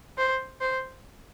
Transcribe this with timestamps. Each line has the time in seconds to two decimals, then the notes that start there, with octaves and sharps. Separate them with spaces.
0.18 C5
0.61 C5